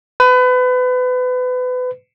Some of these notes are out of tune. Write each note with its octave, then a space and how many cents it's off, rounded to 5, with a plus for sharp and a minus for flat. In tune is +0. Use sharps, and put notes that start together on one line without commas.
B4 +30